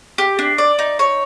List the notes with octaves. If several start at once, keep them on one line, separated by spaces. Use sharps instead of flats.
G4
D4
D5
D#4
C#5